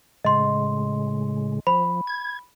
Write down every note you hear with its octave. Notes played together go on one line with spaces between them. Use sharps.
A2 C#3 G#3 D#5 C6
F3 B5
G#6